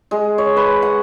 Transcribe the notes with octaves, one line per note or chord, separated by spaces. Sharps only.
G#3
C#5
B4
F#5